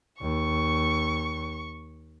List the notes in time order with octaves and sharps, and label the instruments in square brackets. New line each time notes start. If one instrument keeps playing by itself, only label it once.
[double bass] D#2 [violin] C#6